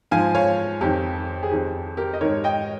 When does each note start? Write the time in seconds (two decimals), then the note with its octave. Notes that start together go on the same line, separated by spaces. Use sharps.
0.11 G#2 F3 F5 G#5
0.35 C#5 F5
0.81 F2 D#3 G4
1.43 G#4
1.51 F2 D#3 G4
1.97 G4 A#4
2.13 D#5
2.21 G#2 D#3 A#4 C#5
2.44 D#5 G5